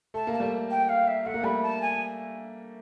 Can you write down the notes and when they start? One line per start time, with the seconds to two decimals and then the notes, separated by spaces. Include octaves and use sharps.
0.14 A3 A5
0.27 A#3
0.33 A5
0.40 G3 A3
0.71 G5
0.89 F5
1.07 E5
1.26 A3 F#5
1.34 A#3
1.43 G3 A3 B5
1.63 A5
1.82 G#5